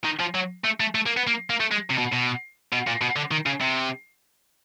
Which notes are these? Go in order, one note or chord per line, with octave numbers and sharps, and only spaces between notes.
D#3
F3
F#3
A3
A3
A3
A#3
B3
A#3
A#3
A3
G#3
C3
B2
B2
B2
A#2
B2
D3
D#3
C#3
C3